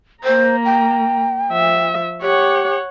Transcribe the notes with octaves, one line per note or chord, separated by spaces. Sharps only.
A#3 C5 A#5
G5
F3 E5
G4 C#5 F#5